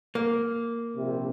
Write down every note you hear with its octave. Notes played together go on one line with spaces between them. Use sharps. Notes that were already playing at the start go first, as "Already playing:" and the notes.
A#3
A#1 C3